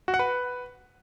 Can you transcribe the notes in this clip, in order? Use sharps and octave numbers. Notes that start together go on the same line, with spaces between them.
F#4
F#5
B4